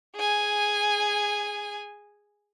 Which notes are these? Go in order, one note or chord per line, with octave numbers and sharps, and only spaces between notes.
G#4 G#5